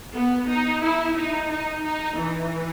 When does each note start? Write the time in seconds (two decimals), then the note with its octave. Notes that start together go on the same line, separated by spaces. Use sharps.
0.15 B3
0.50 D#4
0.83 E4
1.18 D#4
1.52 D#4
1.85 D#4
2.19 E3